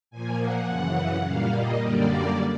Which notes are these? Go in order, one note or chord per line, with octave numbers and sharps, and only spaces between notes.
A#2 F3 A#3 G#5
F#5
F#2 C#3 E3
A#2 G3 A#3 F5
D#5
F#2 D3 G3 A#3 D5